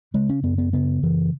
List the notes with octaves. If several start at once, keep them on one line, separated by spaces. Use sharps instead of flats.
C#3 G#3
C#4
F#2 B3
B3
C#3 B3
F#2 E3